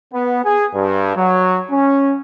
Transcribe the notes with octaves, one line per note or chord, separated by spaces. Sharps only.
B3
G#4
G2
F#3
C#4